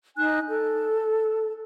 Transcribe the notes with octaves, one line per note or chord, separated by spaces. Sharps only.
D#4 G#5 F#6
A4